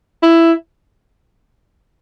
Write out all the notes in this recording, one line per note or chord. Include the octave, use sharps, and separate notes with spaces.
E4